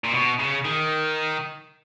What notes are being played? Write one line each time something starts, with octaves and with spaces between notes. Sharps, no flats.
A#2
B2
C#3
D#3